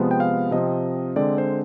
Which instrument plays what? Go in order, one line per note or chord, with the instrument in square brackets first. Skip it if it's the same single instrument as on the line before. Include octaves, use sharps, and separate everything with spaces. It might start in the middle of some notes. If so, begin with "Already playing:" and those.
Already playing: [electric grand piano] C3 F3 G#3 B3
G5
F5
C3 F3 C4 D#5
D3 G#3 C4 D5
C5